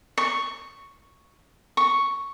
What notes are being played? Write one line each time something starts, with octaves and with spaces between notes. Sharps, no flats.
C#6
C#6